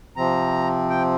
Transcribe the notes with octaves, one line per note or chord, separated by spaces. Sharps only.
C3 F3 C4 A#5
G5